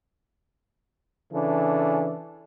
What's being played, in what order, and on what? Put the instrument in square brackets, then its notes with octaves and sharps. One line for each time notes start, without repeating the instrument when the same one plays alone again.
[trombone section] C#3 E3 D4 A4